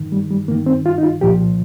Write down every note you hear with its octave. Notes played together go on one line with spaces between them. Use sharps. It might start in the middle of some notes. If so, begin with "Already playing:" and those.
Already playing: G2 D#3
G3
G3
G2 D#3 A#3
C4
F4
D#4
F4
C2 A#2 F3 G4